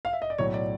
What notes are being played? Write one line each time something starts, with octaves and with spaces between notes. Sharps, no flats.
F5
E5
D#5
D5
B1 A2 F#3 C#5
D5